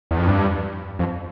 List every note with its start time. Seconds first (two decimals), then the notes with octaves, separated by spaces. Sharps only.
0.11 E2
0.19 F2
0.27 G2
0.99 F2